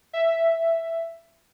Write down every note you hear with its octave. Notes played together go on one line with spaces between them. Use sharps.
E5